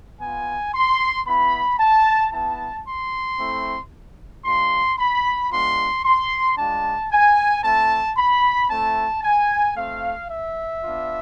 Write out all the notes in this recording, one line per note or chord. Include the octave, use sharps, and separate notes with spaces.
B3 F4 G#5
C6
B3 E4 B5
A5
B3 E4 A5
C6
A3 C4 E4
G#3 D4 F4 C6
B5
G#3 B3 D4 F4 C6
C6
G#3 D4 F4 A5
G#5
A3 C4 E4 A5
B5
A3 C4 E4 A5
G#5
A3 C4 F4 F5
E5
B3 D4 F4